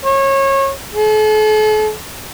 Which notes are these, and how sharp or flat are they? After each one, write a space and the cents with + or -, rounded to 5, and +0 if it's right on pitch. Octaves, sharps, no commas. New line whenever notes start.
C#5 -25
A4 -40